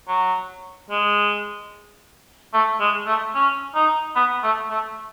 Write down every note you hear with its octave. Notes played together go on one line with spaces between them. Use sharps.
F#3
G#3
A3
G#3
A3
C#4
D#4
B3
A3
A3